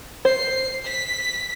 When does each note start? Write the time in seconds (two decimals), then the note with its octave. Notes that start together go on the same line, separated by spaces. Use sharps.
0.25 C5 C7
0.84 B6